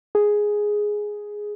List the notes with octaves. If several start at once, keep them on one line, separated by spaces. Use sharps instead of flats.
G#4